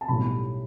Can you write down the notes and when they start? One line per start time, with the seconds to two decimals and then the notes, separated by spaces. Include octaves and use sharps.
0.01 A5
0.08 B1 A2 G3 B5